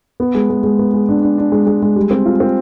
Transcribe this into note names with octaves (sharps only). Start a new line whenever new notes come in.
B3
G#3
G#3
G#3
B3
G#3
D4
D4
D4
G#3
G#3
G#3
G3
C4
F4
C4